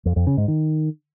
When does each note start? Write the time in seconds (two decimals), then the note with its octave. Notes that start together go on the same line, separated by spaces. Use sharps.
0.05 F2
0.16 F2
0.27 C#3
0.37 G#2
0.48 D#3